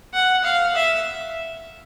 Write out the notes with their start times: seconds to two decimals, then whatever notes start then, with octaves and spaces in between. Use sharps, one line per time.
0.14 F#5
0.44 F5
0.76 E5